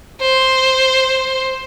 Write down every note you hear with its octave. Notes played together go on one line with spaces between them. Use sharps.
C5